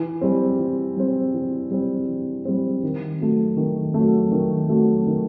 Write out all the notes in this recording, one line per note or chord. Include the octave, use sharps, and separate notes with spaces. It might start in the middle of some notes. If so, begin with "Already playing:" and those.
Already playing: E3
G3 C4
E3
G3 C4
E3
G3 C4
E3
G3 C4
D#3
F#3 A3
D#3
F#3 A3
D#3
F#3 A3
D#3